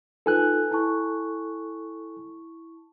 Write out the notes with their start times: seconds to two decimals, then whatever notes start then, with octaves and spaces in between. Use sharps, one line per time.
0.26 D#4 F4 A4 B4 G#5 F#6
0.71 E4 A5 C#6